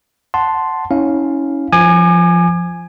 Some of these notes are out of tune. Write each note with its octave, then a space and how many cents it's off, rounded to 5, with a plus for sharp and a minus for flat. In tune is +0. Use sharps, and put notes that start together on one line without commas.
F#5 +0 A5 +0 C6 +0
C#4 +0 E4 -40 F5 +0
F3 -5 G#5 +0 D6 +40